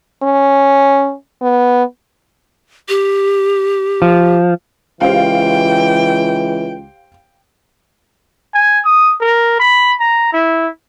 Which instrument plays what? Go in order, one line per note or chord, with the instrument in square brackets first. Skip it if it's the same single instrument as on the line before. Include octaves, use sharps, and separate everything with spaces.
[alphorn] C#4
B3
[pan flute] G4
[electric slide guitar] F3
[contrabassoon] C#2 [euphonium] E3 [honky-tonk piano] G4 C5 F5 [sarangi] G5
[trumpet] G#5
D#6
A#4
B5
A#5
E4